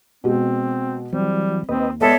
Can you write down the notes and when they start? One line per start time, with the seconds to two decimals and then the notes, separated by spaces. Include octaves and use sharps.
0.24 B2 G#3 C4 F#4
1.13 E3 F#3 G3 C4
1.69 D#2 C4 B4 D#5
2.01 G#3 B3 A4 C#5 D5 E5